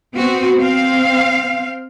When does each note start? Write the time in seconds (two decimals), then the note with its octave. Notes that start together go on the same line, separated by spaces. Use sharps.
0.14 B3 C4 F#4
0.59 C4 F5